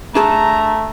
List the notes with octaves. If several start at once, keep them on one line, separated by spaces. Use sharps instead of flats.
A3 D4 G#4 A4 A#5